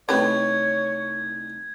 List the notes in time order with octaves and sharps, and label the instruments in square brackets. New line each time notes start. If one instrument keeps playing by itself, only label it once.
[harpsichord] C2 A3 D#4 [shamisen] C4 G4 B4 [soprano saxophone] C#5 [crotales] G#6